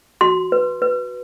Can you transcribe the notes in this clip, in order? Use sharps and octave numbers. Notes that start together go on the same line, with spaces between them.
F#4 C6
B4
B4